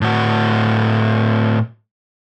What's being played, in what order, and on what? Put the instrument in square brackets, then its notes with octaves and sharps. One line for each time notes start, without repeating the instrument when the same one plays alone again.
[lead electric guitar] A2 F#4